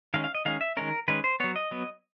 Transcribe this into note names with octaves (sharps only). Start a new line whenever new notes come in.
D#3 G#3 C#4 F5
F5
D#5
D#3 G#3 C#4 F5
E5
D#3 G#3 C#4 A#4
D#3 G#3 C#4 B4
C5
F#3 B3 C#5
D#5
F#3 B3